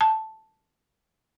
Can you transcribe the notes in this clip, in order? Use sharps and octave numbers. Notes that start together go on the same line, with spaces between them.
A5